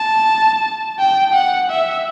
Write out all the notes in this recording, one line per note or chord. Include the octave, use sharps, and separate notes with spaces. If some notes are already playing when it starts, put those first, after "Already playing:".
Already playing: A5
G5
F#5
E5